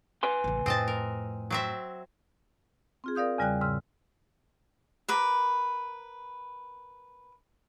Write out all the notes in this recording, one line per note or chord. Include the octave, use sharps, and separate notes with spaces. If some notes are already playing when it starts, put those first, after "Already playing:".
B4 G#5 C6
A1 C#3
F2 A2 C4 D#5 A5
A#4
F#3 C4 E5
C4 F4 G#4
A#4 D5 F5 D#6 G6
E2 C#3 G3 D5 G5 F#6
G#2 C#3 E6
A#4 B4 D6